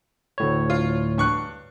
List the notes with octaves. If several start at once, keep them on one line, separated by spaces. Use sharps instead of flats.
D2 A2 C#5
F4
G2 C#6 F#6